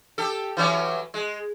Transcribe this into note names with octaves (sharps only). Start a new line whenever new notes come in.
G4 A4
E3 F#3 C#4
G#3